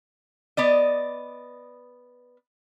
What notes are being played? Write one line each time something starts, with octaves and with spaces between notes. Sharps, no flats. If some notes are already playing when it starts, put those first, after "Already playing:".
B3 D5 D#5